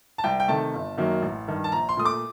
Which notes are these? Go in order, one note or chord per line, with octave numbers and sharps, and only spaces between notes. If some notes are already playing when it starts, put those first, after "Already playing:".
A5
C2 G5
G5
C3 D#3 A3 A5
G1
F#2 D#3 F#3 A#3
A1
G2 D#3
A5
A#1 A#5
C6
A#2 A3 D#6
D6